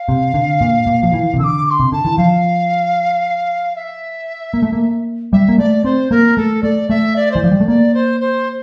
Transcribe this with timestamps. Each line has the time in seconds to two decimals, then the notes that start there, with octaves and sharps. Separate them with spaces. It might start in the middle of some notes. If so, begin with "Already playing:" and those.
Already playing: F5
0.09 C3
0.34 D3
0.61 A#2
0.87 A#2
1.03 F3
1.13 E3
1.34 C3
1.39 D3 D6 E6
1.66 D6
1.70 C6
1.80 C3
1.92 D3 A5
2.05 E3
2.18 F3 F5
3.76 E5
4.54 A#3
4.62 A3
4.72 A#3
5.32 G3 E5
5.49 A#3
5.58 A3 D5
5.84 C4 C5
6.11 A#3 A#4
6.37 A3 A4
6.63 A3 D5
6.89 A3 E5
7.16 D5
7.31 E3 C5
7.42 F3 D5
7.52 G3
7.60 A3
7.68 A#3 D5
7.94 C5
8.20 C5